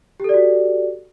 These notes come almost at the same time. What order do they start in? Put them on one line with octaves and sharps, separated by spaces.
G4 A4 D5 F#4